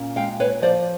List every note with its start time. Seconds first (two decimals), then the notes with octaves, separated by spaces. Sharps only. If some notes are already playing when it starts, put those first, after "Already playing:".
Already playing: A#2 C#4
0.16 G#3 F5 G5
0.40 B4 C#5
0.62 F3 C5 D5